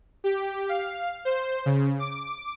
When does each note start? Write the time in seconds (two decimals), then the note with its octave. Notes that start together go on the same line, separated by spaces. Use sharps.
0.24 G4
0.69 F5
1.25 C5
1.66 C#3
1.99 D6